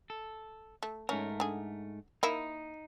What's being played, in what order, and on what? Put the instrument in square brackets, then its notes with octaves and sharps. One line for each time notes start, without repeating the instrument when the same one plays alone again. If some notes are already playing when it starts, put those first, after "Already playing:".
[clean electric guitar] A4
[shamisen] A3
[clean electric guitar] G#2 A3 A#4 [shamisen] C#4
[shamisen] D3 G#4
[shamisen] A#3 E4 [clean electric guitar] D#4